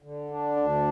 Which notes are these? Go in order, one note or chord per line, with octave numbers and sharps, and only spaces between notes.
D3
D4
D2